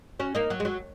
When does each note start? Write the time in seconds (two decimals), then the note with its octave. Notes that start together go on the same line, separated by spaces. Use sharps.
0.20 C#4 F#4
0.35 A#3 D#4
0.50 F#3
0.60 G#3
0.65 F#3